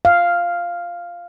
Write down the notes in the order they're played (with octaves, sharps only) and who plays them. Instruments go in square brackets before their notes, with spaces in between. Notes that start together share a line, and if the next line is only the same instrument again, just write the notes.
[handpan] F5